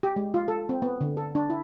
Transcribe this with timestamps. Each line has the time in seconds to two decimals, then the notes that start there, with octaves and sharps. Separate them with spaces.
0.03 G4
0.16 G#3
0.34 F4
0.48 A4
0.69 C4
0.82 B3
1.01 D3
1.17 A4
1.35 D4
1.50 E4